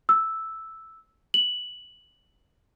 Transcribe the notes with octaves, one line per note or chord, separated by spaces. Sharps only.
E6
F#7